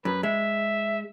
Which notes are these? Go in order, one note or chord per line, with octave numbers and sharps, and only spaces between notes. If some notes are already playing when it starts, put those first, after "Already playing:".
F#2 B4
G#3 E5